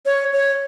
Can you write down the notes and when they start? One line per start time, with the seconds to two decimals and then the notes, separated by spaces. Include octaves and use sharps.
0.06 C#5
0.33 C#5